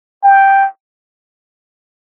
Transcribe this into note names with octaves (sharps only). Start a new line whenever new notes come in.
G5